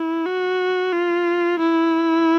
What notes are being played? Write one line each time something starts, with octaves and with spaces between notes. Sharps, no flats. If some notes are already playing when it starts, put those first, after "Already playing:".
Already playing: E4
F#4
F4
E4